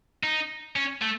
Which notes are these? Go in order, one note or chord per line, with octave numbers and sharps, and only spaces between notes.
D#4
C#4
A3